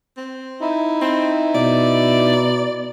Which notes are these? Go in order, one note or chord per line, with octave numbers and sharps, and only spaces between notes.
C4
D#4 E4
C4
B2 D5